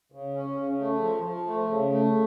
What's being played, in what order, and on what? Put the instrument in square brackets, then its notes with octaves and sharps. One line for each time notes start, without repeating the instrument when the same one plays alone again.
[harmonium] C#3
C#4
C#3
A3
F3
F3
A3
C#3
A3